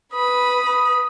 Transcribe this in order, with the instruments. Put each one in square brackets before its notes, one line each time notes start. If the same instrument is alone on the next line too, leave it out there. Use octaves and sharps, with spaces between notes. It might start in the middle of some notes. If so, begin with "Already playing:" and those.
[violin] B4 B5 [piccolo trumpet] D#6